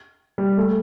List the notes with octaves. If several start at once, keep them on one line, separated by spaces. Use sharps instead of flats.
G3
A3